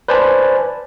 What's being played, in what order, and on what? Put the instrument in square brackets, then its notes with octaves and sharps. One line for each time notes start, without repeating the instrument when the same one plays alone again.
[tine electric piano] B4 C5 D5 G#5 A5 B5